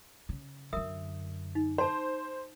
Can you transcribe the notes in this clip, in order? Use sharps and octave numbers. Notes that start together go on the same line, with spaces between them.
C#3
F#2 D3 A#4 E5 D#6
D#4
C5 A5 C6